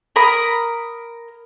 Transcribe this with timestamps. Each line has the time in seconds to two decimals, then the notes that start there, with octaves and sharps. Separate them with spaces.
0.16 A#4 B5 D#6